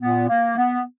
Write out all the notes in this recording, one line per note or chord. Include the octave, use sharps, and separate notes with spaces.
A#2 B3
A#3
B3